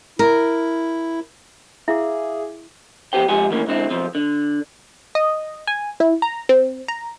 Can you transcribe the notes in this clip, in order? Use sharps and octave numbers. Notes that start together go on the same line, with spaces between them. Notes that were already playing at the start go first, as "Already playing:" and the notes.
E4 A#4
E4 G#4 E5 F5 D6
F2 E3 B3 G4 C5 G5
F2 G#3 F4 G4 F#5 G#5
D#2 E3 A3 A#3 C#4
G#2 D3 C4 E4
B1 F3 C4
D3
D#5
G#5
E4
A#5
C4
A#5